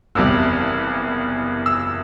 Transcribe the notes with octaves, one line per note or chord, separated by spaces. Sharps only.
F#1 E2 C3 G3 E6
E6